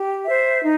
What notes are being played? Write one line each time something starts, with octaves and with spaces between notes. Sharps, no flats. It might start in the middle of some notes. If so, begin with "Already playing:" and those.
Already playing: G4
C5 E5
D#4